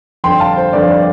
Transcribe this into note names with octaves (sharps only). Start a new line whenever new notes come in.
G1 F2 D3 G5 C6
F5 A5
C5
G1 F2 D3 D5
F5
D5